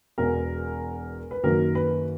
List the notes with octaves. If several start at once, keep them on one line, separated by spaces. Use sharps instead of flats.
E1 E2 B2 A#4
B4
F#2 D#3 F#3 A#3 A#4
B4